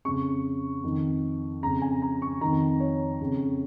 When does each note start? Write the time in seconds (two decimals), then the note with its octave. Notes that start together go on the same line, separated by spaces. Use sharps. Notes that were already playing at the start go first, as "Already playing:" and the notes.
0.05 F2 C#3 C#6
0.83 F2 D#3
1.63 F2 C#3 A#5
1.82 G#5
2.02 A#5
2.22 C#6
2.41 F2 D#3 A#5
2.80 C#5
3.20 F2 C#3